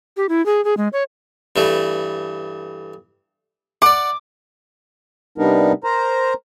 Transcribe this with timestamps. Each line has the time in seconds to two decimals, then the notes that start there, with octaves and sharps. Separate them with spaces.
0.17 G4
0.29 E4
0.46 G#4
0.65 G#4
0.77 G#3
0.93 C#5
1.56 G2 E3 A3
3.82 D5 F#5 D6
5.38 C3 G3 B3 D4 D#4 A#4
5.84 A#4 C5 A#5